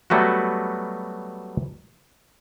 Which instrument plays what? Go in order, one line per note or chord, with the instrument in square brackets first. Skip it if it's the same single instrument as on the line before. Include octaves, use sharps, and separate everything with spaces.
[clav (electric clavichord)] F#3 G3 A3 B3 F#4